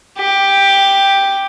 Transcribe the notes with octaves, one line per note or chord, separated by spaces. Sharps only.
G4